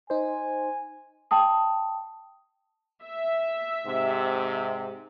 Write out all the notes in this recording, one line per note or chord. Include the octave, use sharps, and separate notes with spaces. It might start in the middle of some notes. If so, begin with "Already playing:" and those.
D#4 C5 G#5
G5 A5 D#6
E5
G#2 C3